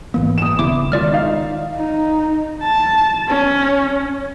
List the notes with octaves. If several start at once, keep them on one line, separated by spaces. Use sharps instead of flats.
G#2 E3 A#3 B3
D#6 E7
D#1 C#3 B3 E4 D6
D#3 G#3 F4 D5 F6
D#4 F5
D#4
A5
C#4